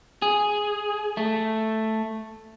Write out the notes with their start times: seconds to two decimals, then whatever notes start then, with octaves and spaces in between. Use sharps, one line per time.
0.22 G#4
1.17 A3